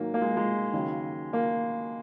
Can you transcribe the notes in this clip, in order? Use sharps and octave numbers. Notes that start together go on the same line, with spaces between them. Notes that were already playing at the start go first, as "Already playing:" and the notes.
Already playing: G#2 D#3 F#3 A#3
A#3
G#3
G#3
D#2 C#3 F#3
A#3